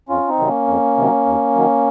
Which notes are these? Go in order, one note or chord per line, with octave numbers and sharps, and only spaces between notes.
F2 C#4 F4
C4 D#4
C3 D#3 F#3
A#3 C#4
F2
C3 D#3 F#3
D#2
D#3 F#3